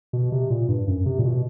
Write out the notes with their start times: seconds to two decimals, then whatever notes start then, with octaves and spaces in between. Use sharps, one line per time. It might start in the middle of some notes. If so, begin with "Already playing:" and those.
0.13 B2
0.32 C3
0.50 A#2
0.69 G2
0.88 F#2
1.06 C3
1.19 A#2
1.25 B2